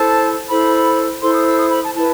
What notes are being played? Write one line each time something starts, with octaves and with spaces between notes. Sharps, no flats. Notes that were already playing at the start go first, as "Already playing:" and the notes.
Already playing: E4 A4 C5 A5
E4 A4 C5 B5
E4 A4 C5 C6
D#6
E6
D#6
B5
A5
E4 B4 A5